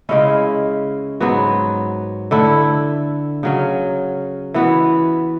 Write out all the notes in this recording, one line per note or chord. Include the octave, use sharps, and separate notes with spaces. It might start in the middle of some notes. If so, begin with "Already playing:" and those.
C#3 G#3 C#4 E4
G#2 F#3 B3 F#4
D3 A3 E4
C#3 F#3 C#4
E3 B3 F#4